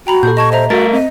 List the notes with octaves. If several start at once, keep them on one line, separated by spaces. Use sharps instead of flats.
F#4 G5 A#5 B5
A#2 G4 A4 G6
D#5 A5 C#6 G#6
C5 D#5 E5 A#5
A3 F#4 A#4 A6
C4 D#5